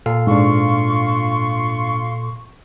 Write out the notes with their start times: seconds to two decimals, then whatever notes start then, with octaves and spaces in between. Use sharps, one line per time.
0.06 A#2 A4 F5
0.27 G#2 D4 F4 C6 C#6